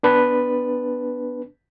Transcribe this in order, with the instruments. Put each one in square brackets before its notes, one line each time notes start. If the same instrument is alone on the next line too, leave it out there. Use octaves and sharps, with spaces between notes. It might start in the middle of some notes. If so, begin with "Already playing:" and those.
[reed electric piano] B3 D4 B4